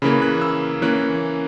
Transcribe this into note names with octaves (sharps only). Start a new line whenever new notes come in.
C#3 E3 A#3 B5
F#6
E6
E3 A#3 C#4 F#6